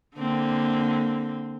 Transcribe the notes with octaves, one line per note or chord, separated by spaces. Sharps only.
D3 A#3 C4